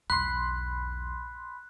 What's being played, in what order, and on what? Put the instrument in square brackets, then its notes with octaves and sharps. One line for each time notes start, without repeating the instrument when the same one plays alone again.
[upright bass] B1 E2 [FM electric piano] B5 C6 [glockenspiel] F#6